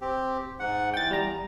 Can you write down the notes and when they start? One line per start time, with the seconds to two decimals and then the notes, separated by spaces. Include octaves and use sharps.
0.01 C4 G4
0.60 G#2 F#5
0.94 E2 G5 A6
1.11 G3 A#5